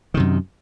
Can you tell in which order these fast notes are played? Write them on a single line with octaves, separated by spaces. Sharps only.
D#3 C3 F#2